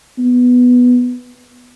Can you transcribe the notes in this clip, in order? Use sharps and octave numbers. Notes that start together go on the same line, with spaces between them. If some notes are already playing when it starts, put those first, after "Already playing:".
B3